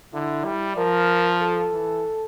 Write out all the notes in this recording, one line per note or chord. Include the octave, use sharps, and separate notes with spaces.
D3 E4
G3
F3 A#4
A4
E3